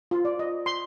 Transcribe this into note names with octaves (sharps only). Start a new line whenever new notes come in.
F4
D5
D#5
C6